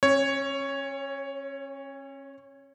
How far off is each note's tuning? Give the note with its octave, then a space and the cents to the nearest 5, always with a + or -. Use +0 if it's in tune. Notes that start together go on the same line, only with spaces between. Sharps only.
C#4 -35 C#5 +0